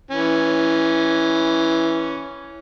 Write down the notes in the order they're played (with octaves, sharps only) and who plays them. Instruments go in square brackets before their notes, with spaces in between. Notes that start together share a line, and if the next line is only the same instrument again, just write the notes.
[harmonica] E3 C#4